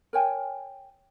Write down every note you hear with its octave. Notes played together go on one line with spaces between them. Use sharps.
A#4 C#5 G5 G#5